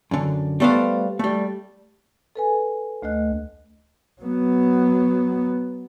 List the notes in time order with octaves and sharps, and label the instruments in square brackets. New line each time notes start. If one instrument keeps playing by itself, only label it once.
[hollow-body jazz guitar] F#2 D3
G3 A3 B3 C5 F5
G3 A3
[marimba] A4 B4 G#5
D2 A3 D#5 F#6
[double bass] F#3 B3